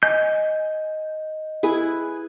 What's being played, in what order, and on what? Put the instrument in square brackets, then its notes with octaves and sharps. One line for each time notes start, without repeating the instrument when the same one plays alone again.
[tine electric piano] D#5 [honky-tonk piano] G#5 [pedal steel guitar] G6
[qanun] E4 B4 G#5 [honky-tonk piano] G#4